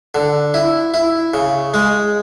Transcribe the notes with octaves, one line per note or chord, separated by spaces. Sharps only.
D3
E4
E4
C#3
G#3